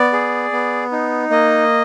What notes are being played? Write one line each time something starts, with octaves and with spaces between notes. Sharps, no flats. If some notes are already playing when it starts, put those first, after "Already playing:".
Already playing: B3 D5
G#4
B3
D#4
A#3 D#5